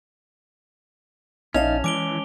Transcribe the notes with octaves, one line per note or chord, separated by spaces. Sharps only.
A#1 C#4 D#4 D5 F5 A5 F7
E3 G#3 D6 D7 G7